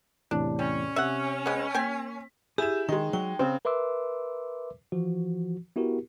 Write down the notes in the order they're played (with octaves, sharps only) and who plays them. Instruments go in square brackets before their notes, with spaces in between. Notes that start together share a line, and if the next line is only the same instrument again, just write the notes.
[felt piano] E2 A2 C3 [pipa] D4
[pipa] G3 [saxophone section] C#4
[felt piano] C3 [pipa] E5 F#5
[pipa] G#3 B3
[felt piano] A#3 B6 [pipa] G5 G#5
[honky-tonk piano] E4 E7 [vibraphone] G4 [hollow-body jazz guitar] G#4
[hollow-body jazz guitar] D#3 [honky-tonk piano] G#3 D#4 [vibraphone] G5
[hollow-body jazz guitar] F#3 [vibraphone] G5
[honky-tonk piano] C#3 [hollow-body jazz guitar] C4 C5
[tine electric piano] A#4 B4 E5 C6 D6 E6
E3 F3 F#4
B3 E4 F#4 G4 A#4